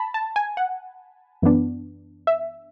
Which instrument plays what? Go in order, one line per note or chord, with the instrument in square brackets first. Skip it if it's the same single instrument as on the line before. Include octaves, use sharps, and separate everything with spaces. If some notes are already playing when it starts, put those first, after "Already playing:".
Already playing: [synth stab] A5 B5
A5
G#5
F#5
F#2 E3 B3 D4
E5